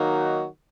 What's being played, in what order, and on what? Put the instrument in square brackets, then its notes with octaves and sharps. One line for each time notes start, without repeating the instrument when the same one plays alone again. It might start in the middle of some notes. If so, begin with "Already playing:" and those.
Already playing: [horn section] D#3 F#3 A#3 D#4 F#4